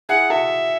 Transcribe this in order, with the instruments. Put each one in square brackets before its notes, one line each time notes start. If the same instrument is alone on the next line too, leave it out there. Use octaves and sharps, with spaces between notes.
[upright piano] E4 G#4 [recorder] F#5
[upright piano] F#4 A4 [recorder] E5